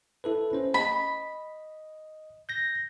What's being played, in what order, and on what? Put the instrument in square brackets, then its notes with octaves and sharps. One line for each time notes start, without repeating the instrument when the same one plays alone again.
[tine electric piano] E4 A4 B4
C#4 C5
[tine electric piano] D#5 [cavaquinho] B5
[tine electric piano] G6 A#6